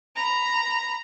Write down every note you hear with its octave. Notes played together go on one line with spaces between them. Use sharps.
A#5 B5